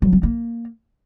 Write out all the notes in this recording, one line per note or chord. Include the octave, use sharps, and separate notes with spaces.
F#3
C4
A#3